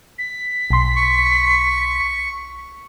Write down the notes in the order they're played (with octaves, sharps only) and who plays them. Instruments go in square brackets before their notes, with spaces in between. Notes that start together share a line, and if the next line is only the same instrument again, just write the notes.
[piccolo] B6
[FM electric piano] B1 C6
[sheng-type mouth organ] C#6